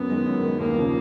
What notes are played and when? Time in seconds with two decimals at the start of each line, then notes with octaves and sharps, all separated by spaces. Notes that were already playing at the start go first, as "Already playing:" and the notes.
Already playing: F#2 B3
0.10 D#3 G#3
0.26 F#2
0.43 D#3 G#3
0.60 D#2 A#3
0.76 C#3 F3